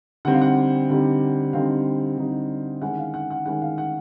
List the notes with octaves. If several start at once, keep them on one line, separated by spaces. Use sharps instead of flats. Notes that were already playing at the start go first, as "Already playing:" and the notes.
D3 G3 C4 D#4 F#5
F5
F#5
D3 G3 C4 D#4
D3 G3 C4 D#4 F5
D3 G3 C4 D#4
D#3 G#3 C#4 E4 F#5
F5
F#5
F#5
D#3 G#3 C#4 E4 F#5
F5
F#5